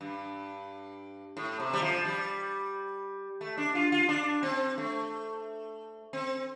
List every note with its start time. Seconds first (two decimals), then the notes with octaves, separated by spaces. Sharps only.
0.01 G2
1.37 A2
1.60 C3
1.73 G3
1.82 F3
2.05 G3
3.41 A3
3.57 D4
3.75 F4
3.92 F4
4.09 D4
4.43 C4
4.78 A3
6.13 C4